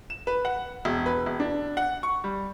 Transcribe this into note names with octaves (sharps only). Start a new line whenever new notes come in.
E7
B4
F#5
E1
B4
E1
D4
F#5
C#6
G3